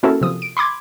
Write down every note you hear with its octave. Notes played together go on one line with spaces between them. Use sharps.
A#3 C#4 E4 F#4 A4 A#4
C3 F3 D#6
D7
B5 C6 D6 G#6